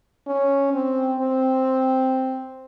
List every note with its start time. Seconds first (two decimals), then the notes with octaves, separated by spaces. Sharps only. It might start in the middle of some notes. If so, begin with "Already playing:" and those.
0.27 C#4
0.73 C4
1.19 C4